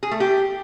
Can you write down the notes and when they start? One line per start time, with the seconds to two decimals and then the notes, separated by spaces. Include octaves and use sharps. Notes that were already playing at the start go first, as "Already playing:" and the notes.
0.03 G#4
0.11 A3
0.20 G4